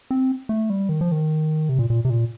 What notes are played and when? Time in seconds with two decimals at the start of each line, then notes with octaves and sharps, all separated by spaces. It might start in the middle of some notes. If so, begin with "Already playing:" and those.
0.11 C4
0.49 A3
0.70 G3
0.89 D#3
1.01 F3
1.12 D#3
1.69 C3
1.79 A#2
1.90 A#2
2.05 C3
2.10 A#2